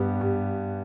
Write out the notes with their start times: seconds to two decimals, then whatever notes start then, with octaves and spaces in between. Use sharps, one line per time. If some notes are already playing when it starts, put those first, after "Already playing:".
Already playing: G2 B3 G4
0.21 G2